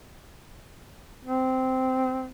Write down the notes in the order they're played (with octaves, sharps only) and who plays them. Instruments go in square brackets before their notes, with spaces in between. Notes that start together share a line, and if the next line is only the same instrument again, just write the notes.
[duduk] C4